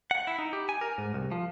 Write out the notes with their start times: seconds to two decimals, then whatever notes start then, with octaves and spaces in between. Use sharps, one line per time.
0.11 F#5
0.27 E4
0.39 D#4
0.53 G4
0.69 G#5
0.81 A#4
0.98 G#2
1.14 C2
1.32 F3